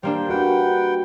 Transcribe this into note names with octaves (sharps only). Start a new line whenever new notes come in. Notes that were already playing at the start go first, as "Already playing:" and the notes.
G3 A#3 D4 C5 G5
F#4 B4 F#5 G5